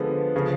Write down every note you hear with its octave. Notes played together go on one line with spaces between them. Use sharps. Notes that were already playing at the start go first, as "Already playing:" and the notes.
Already playing: D3 F3 G#3 B3
C#3 F3